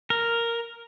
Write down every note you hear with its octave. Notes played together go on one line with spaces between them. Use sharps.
A#4